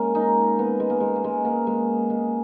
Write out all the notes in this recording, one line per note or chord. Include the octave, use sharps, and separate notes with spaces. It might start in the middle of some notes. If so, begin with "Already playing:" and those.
Already playing: G#3 A#3 C#4
D#4
B3
G#3
A#3
G#3
A#3
G#3
A#3
G#3
G#3